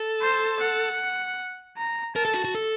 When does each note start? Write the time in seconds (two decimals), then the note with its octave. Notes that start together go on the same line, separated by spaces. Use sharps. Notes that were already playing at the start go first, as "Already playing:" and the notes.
Already playing: A4
0.22 C5
0.60 F#5
1.77 A#5
2.16 A#4 A5
2.25 A4
2.34 F#4
2.44 F#4
2.55 A4